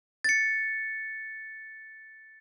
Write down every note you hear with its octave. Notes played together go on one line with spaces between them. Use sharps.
A6 C#7